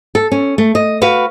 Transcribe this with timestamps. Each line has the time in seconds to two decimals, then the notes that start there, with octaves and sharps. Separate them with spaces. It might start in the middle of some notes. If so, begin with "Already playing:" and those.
0.15 A4
0.32 C#4
0.58 A3
0.75 D#5
1.01 F#4 B4 F5